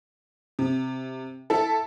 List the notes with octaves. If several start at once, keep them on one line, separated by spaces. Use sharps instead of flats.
C3
E4 A4